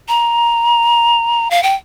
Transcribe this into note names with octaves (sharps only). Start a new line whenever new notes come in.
A#5
F5
G5